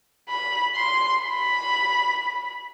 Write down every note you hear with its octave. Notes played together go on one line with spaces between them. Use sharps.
B5
C6
B5